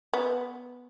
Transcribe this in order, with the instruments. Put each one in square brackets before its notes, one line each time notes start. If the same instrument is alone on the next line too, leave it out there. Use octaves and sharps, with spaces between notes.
[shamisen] B3